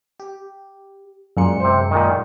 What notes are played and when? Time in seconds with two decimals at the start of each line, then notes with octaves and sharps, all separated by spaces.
0.20 G4
1.37 F#2 A#2 G#3 C#7
1.60 C3 C5
1.91 A#2 D#3